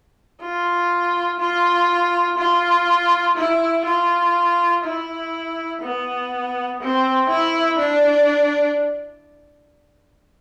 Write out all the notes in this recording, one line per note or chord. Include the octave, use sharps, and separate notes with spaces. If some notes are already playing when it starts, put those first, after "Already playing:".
F4
F4
F4
E4
F4
E4
B3
C4
E4
D4